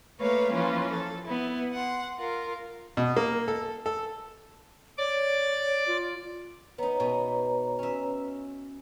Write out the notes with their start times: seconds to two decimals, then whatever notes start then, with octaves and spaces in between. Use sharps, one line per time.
0.20 A3 A#3 B4 C#5 F5
0.51 E3 F3 A#3 C#4 F4
0.90 A4
1.25 B3 E4
1.73 F#5 C6
2.19 F4 A#4
2.97 B2
3.16 A#3
3.48 A4
3.86 A4
4.98 C#5 D5 D6
5.88 F4
6.78 B3 D#4 B4 C#5 A#5
7.00 B2
7.79 C#4 E5